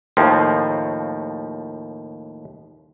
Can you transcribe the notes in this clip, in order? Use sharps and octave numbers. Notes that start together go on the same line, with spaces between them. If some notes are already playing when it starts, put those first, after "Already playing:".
D#2 A2 F3